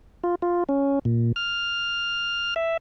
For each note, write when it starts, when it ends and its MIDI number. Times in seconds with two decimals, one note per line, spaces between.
0.24 0.35 65
0.42 0.64 65
0.69 0.99 61
1.05 1.32 46
1.36 2.54 89
2.56 2.77 76